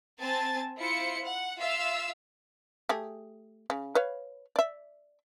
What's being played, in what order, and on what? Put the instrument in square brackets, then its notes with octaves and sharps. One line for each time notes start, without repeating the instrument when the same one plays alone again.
[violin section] C4 G#5 A5 A6
E4 F4 C5 C#7
F#5
F4 E5 F5 E6
[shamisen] A3 G4 G#4
C#3
B4 C#5 F5
D5 E5